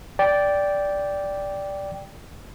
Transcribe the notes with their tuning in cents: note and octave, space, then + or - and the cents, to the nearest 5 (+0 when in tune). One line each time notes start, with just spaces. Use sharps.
D5 -10 G5 +0